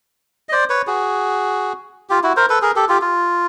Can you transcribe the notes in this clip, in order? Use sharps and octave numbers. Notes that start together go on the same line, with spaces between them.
D#5
C5 D5
B4 C#5
F#4 G#4
F4 G4
E4 F#4
A#4 C5
A4 B4
G#4 A#4
G4 A4
F4 G4
F4